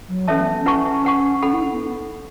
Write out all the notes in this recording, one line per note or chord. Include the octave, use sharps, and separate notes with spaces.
F#3
E3 C#4 A4 C#5 E5 A5
B3
C#4
C#4 E4 B4 F#5 A5 C#6
B4 F#5 C#6
C#4 A4 F#5 B5
E4
C#4
B3